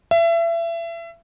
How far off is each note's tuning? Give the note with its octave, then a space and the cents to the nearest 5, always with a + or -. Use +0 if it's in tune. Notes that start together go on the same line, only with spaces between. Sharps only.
E5 +30